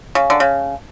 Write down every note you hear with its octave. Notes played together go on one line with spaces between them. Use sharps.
C#3
D3
C#3